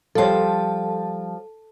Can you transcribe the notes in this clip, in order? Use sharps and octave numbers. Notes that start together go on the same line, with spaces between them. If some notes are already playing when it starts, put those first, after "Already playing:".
F3 G3 A4 C5 A5